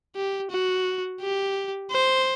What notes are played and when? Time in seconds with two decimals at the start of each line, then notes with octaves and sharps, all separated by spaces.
0.16 G4
0.51 F#4
1.21 G4
1.92 C5